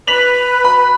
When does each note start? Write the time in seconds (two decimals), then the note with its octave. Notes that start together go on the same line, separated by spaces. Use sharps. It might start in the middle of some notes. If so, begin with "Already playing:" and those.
0.07 B4 B6 F7 F#7
0.64 B5